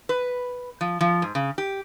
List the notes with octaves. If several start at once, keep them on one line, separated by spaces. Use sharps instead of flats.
B4
F3
F3
G#2
C#3
G4